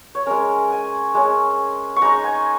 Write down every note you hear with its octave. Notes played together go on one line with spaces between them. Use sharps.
C#5
G#3 C#4 A#4
G#5
G#3 C#4
C#6
G#3 D#4 A#5
G#5